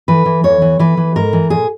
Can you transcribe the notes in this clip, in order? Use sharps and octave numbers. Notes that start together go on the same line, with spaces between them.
E3 B4
E3
E2 C#5
E3
E3 B4
E3
G#2 A#4
E3
A#2 G#4